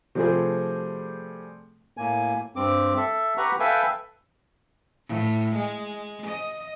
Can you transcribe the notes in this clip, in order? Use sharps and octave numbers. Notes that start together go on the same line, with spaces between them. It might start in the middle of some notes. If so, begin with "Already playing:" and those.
C3 F3 G3 A3 C4 G#4
A2 A#3 G#5
G2 C4 D6
A4 E5
G4 B4 F#5 A#5 C#6
A4 B4 E5 F5 G5 G#5
A2
G#3
D#5